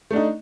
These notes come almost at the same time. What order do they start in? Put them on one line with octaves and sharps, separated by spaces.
A3 D4 D#4